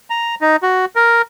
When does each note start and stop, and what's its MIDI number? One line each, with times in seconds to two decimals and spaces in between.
0.10 0.35 82
0.41 0.56 63
0.63 0.85 66
0.96 1.22 70